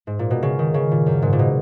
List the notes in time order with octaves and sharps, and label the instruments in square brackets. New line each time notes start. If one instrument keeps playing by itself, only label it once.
[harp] G#2
A#2
B2
C#3
D#3
C#3
A#2
F#2
G#2
A#2
B2